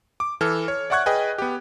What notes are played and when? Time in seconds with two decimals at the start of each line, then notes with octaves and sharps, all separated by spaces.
0.20 D6
0.41 E3 A4 F6
0.68 C#5
0.90 D5 E5 F#5 C#6 F#6 G#6
1.06 G#4 B4 D#5 G5 G#5
1.38 B3 G4